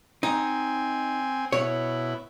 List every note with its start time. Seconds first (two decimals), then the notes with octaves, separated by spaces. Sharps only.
0.23 C4 D#4 G#5
1.52 B2 E4 C#5